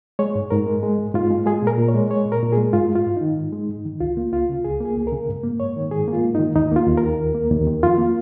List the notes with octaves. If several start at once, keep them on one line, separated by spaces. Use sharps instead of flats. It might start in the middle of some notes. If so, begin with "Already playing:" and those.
G#3 C#5
G#2
G#2 A#4
G#3
G#3
G#2
G#2 F4
G#3
G#3 G#4
A#2 A#4
A#2
C#5
G#3
G#3 C#5
A#2
A#4
A#2
G#3 G#4
G#2 F4
G#3
F4
G#2
D#3 D#4
G#2
G#3
G#2
D#3
C#2 F4
A#3
C#2 F4
C#3
C#2 G#4
A#3 G#4
C#2
G#4
C#3 A#4
G#2
A#3
G#2 C#5
D#3
G#2 G#4
A#3
F4
G#2
D#3 D#4
D#2 D#4
A#3 F4
D#2
A#4
D#3
D#2
A#3
D#2
D#3
F2 F4
A#3